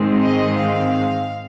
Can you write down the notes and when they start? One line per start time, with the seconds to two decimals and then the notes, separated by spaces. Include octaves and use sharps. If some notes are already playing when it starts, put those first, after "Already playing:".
Already playing: G#2 D#3 G#3 C4
0.20 D#5
0.58 F5